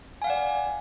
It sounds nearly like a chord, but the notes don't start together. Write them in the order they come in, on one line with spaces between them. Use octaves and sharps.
G#5 F5 F#5 D5